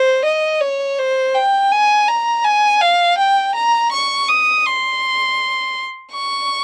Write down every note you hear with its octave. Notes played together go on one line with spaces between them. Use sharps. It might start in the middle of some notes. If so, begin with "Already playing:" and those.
Already playing: C5
D#5
C#5
C5
G5
G#5
A#5
G#5
F5
G5
A#5
C#6
D#6
C6
C#6